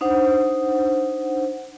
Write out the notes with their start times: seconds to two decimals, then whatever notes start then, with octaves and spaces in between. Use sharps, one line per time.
0.01 D4 D#4 C5 F#5